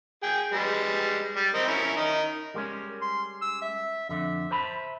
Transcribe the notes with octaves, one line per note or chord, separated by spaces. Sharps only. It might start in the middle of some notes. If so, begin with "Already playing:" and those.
G#4 G5
G3 G#3 B4
G3
C4 A#4 D#5
C#4 E4 A#4
D#3 A#4 D#5
G3 G#3 C#4 A#4
C6
E6
E5
F2 D3 E5
C5 A5 B5